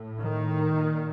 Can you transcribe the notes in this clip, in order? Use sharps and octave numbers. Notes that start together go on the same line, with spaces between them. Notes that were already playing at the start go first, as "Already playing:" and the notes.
Already playing: A2
D#3
A#2